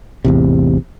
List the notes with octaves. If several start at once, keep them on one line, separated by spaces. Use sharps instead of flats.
A1 E2 C3